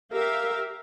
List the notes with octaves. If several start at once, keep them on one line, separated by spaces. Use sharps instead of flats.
G4 A#4 E5 F5